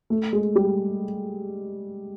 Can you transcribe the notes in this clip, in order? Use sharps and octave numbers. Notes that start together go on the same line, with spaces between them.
A3
G#3
G3